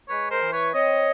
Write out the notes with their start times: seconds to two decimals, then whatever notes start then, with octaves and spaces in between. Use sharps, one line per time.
0.09 G#3 B4 C#5
0.31 A#4 C5
0.41 E3
0.53 B4 C#5
0.74 C4 C#5 D#5